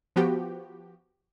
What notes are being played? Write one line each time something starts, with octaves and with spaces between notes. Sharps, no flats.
F3 B3 F#4 G4